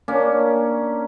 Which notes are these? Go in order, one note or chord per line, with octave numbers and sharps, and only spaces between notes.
A#3 C#4 D4